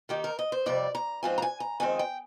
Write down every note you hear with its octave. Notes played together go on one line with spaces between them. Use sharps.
D#3 A#3 D#4 G4
A#4
D#5
C5
F2 C3 G3 D5
A#5
G#2 F3 C4 F4 G#5
A#5
G#5
A#5
F2 D#3 G#3 C4 G#5
G5